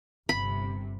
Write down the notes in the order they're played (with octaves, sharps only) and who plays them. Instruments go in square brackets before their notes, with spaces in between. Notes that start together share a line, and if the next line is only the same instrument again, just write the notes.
[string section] G1 C3 [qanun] B5